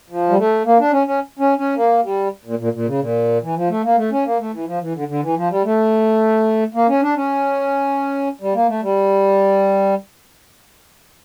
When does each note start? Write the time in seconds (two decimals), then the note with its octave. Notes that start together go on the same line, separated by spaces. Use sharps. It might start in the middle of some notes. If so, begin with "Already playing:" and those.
0.10 F3
0.29 G3
0.38 A3
0.65 A#3
0.79 D4
0.93 C#4
1.07 C#4
1.39 C#4
1.58 C#4
1.76 A#3
2.03 G3
2.45 A#2
2.59 A#2
2.73 A#2
2.87 C#3
3.00 A#2
3.43 E3
3.56 F3
3.69 A3
3.84 A#3
3.97 A3
4.12 C#4
4.25 A#3
4.39 A3
4.53 E3
4.67 F3
4.81 E3
4.95 D3
5.08 D3
5.22 E3
5.36 F3
5.50 G3
5.64 A3
6.75 A#3
6.89 C#4
7.02 D4
7.16 C#4
8.41 G3
8.55 A#3
8.68 A3
8.82 G3